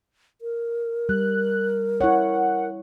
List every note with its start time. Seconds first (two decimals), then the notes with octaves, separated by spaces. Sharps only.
0.41 A#4
1.09 G3 F#6
2.01 E4 C#5 F#5